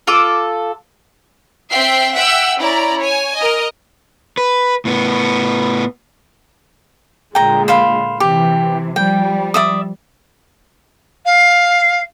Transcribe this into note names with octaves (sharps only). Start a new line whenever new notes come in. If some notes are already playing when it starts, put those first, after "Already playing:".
F4 A4 D6 E6
C4 E5 G5 C7
E5 F#5 G5 E6
C#4 E4 D5 A#5
C#5 G#5
A#4 D#5
B4
A2 B3
A#2 D3 G#3 G5 A#5
C5 F5 B5
C3 E3 G4
F3 G3 G5
D5 E5 D#6
F5